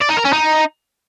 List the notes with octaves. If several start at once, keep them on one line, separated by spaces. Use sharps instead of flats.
D5
D#4
A#4
C#4
D#4